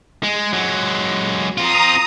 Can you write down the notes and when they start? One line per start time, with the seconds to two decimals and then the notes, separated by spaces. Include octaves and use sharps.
0.23 G#3
0.53 F#3 G#3
1.58 C4 F4 A#5 D#6